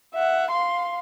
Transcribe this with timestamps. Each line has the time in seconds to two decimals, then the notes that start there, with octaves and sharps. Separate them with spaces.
0.14 E5 F#5
0.51 F5 C6